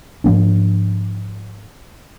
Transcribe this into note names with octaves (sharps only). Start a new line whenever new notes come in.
G#2 F3 A#3 D4